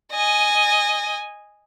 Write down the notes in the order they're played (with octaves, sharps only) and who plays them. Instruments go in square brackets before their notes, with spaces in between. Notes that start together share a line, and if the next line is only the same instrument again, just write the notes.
[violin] D#5 G#5